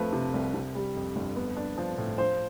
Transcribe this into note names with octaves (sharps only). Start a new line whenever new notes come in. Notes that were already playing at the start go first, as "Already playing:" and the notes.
Already playing: F2 F3 A3 B4
C3
C2
C3
G3
F2
G1
B3
D4
F3
A2
F3 C5